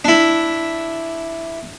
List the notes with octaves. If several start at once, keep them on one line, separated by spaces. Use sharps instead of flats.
D4 E4